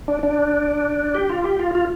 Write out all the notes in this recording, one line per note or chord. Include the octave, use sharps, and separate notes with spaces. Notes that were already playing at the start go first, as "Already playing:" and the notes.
D4
D4
G4
F4
G4
F4
F4